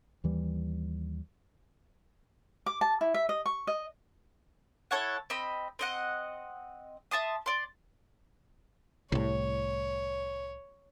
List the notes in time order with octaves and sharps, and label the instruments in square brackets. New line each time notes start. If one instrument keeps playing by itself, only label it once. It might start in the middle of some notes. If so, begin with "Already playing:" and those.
[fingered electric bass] D#2 E3 G3
[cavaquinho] D6
A5
E4
E5
D#5
C#6
D#5
[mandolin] E4 A4 C#5 F#5
C4 D#5 B5
C4 D#5 F#5
E5 A5 C6 D#6
D5 C6
[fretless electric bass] C2 A2 [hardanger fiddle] C#5